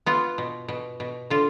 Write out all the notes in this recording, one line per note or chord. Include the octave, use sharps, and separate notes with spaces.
B3 F4
B2
B2
B2
D3 F4